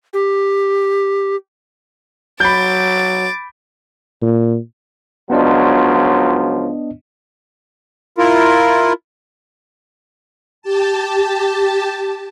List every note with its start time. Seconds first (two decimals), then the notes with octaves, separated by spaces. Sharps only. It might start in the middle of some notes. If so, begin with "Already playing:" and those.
0.13 G4
2.40 F#3 B5 D6 G6 A6
4.22 A#2
5.30 C#2 F3 F#3 B3 D4 D#5
8.18 E4 F4 A#4
10.62 G4 A5